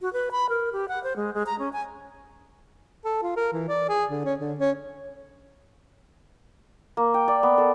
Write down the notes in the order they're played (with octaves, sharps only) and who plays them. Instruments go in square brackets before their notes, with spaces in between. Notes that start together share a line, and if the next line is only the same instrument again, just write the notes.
[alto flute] F#4
B4
B5
A#4
G4
F#5
C5
G#3
G#3
A#5
C#4
G#5
[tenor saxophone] A4
F4
A#4
E3
D5
G#4
D3
C#4
D3
C#4
[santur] A#3
G5
D5
B3
A4